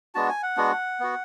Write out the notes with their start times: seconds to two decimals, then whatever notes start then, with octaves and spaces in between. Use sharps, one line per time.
0.15 G#3 B3 D4 F#4 A5
0.29 G#5
0.43 F#5
0.57 G#3 B3 D4 F#4
1.00 B3 F#4